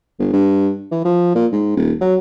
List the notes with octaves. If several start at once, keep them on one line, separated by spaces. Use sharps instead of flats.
G1
G2
E3
F3
A#2
G#2
D#1
F#3